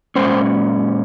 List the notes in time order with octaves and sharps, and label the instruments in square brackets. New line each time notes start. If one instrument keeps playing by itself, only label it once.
[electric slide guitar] A#2 G#3 C#4 C5